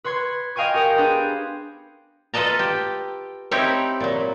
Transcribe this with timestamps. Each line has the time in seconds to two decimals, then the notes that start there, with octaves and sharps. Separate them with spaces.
0.04 B4 C#5 C6 G#6
0.56 C#5 D#5 F5 G5 G#5 C#6
0.74 G4 A#4 C#5 D#5 G5
0.98 B3 D4 G4 G#4 B4 C5
2.34 F4 A4 B4 D#5 A5 A#5
2.59 G4
3.51 C4 D#4 E4 G4 C#5
4.00 A#2 F#3